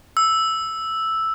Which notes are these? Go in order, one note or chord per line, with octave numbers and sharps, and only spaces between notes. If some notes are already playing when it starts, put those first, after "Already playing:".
E6